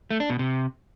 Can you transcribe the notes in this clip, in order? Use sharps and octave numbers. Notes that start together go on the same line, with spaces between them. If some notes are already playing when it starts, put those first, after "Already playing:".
A3
D4
B2
C3